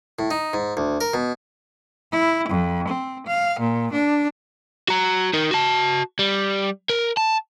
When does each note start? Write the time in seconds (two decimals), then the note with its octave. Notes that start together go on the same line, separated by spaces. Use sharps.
0.19 A2
0.31 D#4
0.53 G#2
0.77 D2
1.01 A#4
1.14 B2
2.12 E4
2.48 F2
2.88 C4
3.26 F5
3.59 A#2
3.93 D4
4.88 F#4 A#5
5.33 D#4 A#4
5.51 F#4 A5
6.19 G3
6.90 A#4
7.17 A5